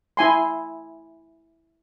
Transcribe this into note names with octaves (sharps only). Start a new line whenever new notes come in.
E4 G#5 C6